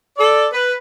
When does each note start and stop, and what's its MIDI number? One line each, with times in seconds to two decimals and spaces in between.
0.18 0.46 69
0.18 0.46 74
0.53 0.74 71